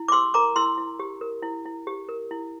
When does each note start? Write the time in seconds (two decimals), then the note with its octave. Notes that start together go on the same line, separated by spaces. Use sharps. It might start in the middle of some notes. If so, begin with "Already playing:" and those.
Already playing: E4
0.08 D6
0.12 G4 C6 E6
0.34 A#4 A#5 D6
0.56 E4 C6 E6
0.78 E4
0.99 G4
1.21 A#4
1.43 E4
1.65 E4
1.87 G4
2.09 A#4
2.31 E4